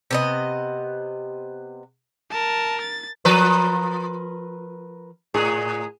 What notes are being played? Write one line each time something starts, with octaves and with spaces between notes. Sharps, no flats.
C3 B3 D#5
A#4 A5
A6
F3 A#4 B4
A2 G#4